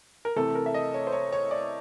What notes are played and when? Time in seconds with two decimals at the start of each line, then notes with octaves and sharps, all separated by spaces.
0.25 A#4
0.36 C3 E3 A3 A4
0.55 A#4
0.66 E5
0.74 D#5
0.94 C#5
1.07 C5
1.13 C#5
1.33 C#5
1.51 D5